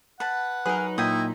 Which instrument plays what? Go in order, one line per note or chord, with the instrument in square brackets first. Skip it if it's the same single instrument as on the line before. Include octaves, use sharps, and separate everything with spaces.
[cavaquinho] B4 A5 [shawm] F#5
[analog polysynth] F#3 D#4 [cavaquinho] G#4 A#4 [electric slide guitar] B4
[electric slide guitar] A#2 [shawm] E4 [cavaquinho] D#5 G5 D#6